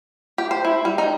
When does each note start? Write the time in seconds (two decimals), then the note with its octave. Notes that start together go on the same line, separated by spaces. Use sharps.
0.38 G4
0.51 C5
0.65 E4
0.85 G3
0.98 D#4